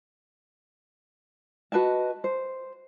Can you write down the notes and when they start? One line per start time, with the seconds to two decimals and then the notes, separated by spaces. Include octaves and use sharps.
1.72 F#4 B4 D#5 A5
2.24 C5